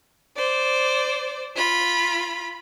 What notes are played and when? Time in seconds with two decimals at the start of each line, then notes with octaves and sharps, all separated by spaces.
0.36 C5 D5
1.56 F4 B5